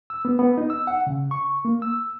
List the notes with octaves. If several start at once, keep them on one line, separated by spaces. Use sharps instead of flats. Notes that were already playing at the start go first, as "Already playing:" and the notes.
E6
B3
B3
D#4
E6
F#5
C#3
C#6
A#3
E6